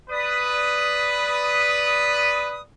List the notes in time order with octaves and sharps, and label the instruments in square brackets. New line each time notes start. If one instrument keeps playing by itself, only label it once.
[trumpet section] B4 [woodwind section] D5 D#6